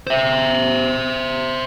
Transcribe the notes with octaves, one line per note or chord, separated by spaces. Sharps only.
C5 E5